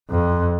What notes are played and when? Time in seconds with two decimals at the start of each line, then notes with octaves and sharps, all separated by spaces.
0.10 F2